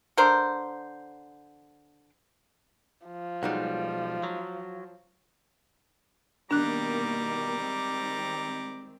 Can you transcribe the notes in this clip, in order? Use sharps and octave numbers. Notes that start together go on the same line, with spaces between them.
D3 A#4 C5
F3
B1 G3 G#3 D#4 F#4
F#3
B2 D#3 G3 A#3 D4 A#5 D6 F#6
D#3 G#3 C4